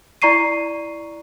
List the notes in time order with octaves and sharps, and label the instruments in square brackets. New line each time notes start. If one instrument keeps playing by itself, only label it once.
[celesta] E4 D5 A#5 C#6 C7 D#7